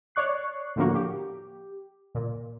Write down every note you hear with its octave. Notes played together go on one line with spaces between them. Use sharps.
C#5 D5 C#6 F#6 C7
A2 D3 F3 A#3 F#4
G4
A#2